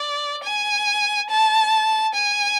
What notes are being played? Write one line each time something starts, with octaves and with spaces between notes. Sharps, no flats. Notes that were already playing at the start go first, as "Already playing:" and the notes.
Already playing: D5
G#5
A5
G#5